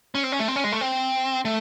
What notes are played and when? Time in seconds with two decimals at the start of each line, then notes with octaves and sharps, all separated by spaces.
0.15 C#4
0.23 C4
0.32 C#4
0.39 A3
0.48 C4
0.56 C#4
0.64 G#3
0.72 A3
0.81 C4
1.45 A3